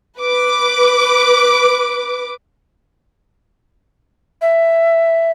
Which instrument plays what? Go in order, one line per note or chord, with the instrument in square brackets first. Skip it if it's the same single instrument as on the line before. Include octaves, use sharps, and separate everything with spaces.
[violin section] B4 D6
[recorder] E5